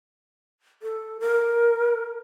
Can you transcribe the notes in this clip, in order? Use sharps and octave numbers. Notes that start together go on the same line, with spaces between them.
A4
A#4